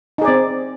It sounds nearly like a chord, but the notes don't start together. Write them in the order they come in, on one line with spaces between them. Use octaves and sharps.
D#4 G#4 D5 C4